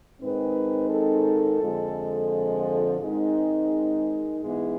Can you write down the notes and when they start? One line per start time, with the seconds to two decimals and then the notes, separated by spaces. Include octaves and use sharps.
0.21 G#2 D#3 G#3 C4 D#4 B4
0.90 A4
1.60 F2 D3 F3 G#3
2.99 G#2 D#3 G#3 C4 D#4
4.39 G#2 E3 G#3 B3